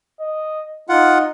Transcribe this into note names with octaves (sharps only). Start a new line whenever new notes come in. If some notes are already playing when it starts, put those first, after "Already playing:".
D#5
D#4 F4 F#5